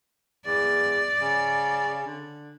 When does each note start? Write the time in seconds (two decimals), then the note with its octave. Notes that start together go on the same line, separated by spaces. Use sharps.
0.46 E2 D5
1.21 C#3
2.06 D3